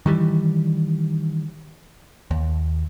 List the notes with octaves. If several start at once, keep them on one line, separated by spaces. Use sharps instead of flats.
D#3 E3 G3
D#2